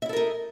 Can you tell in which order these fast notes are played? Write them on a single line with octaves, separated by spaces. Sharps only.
E5 E4 A4 A#4 D#4